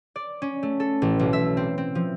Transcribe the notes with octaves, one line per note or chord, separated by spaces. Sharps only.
D5
C#4
A3
A4
A1
B1
E5
C4
C4
F3